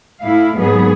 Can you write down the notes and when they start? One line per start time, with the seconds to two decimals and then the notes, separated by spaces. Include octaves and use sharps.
0.21 A2 E4 F5
0.57 D#2 G#2 F#3 B3 G#4